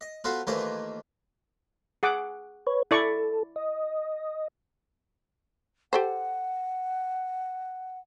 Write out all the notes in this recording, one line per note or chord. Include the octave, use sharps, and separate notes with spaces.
D#5
B3 F4 F#4 A4 C5
D#2 E3 A3 F4 C5 D#5
G#4 F#5 D6
B4 C#5
E4 A4 D5 C#6
D#5
G4 A4 C5 F#5